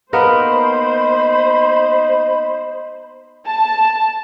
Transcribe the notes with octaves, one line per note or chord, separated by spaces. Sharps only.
A#3 B3 D#4 A#4 C5 B5
A5